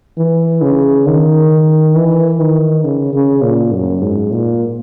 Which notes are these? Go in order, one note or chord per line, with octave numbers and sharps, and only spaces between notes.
E3
C#3
D#3
E3
D#3
C#3
C#3
A#2
F#2
G#2
A#2